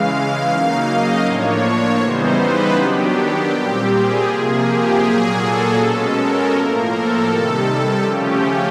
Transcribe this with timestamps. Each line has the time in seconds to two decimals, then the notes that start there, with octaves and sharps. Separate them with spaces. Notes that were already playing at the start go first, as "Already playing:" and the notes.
Already playing: C#3 E3 G#3 F5
0.49 C#3 F#3 A#3 D#4
0.87 D#5
1.25 A2 F3 A#3 D4 C#5
1.63 C#5
2.01 C#3 E3 G3 B3 D#4 C5
2.38 B4
2.76 D#3 F#3 B3 D4 G4
3.51 A#2 G3 C4
3.88 G#4
4.27 C3 F3 A#3 G#4
4.65 G4
5.03 A#2 F#3 A#3 G#4
5.40 A4
5.77 B2 G#3 C#4 A4
6.16 A#4
6.53 A2 F3 A#3
6.91 A4
7.28 C3 D#3 G3 A4
8.03 C#3 F3 A3 C#4 G4